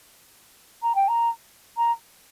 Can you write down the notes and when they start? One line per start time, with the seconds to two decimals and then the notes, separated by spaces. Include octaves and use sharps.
0.82 A#5
0.95 G5
1.08 A#5
1.77 A#5